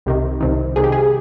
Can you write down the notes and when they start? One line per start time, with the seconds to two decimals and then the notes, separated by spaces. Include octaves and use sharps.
0.06 C2 C3 D#3
0.41 C2 C3 D#3
0.76 C2 C3 D#3 G#4
0.84 G4
0.92 G#4